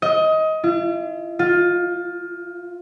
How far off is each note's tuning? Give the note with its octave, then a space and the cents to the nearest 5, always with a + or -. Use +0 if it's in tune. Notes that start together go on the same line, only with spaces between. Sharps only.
D#5 +20
F4 -45
F4 +15